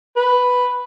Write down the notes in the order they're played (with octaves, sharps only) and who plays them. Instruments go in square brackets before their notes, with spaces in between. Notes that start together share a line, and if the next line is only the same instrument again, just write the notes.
[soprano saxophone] B4